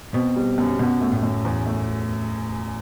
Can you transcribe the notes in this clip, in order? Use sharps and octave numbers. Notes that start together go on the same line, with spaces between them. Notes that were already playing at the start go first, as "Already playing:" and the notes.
B2 C4
G3
F#2
F#2 B2
A3
A2
F#2
E2
A3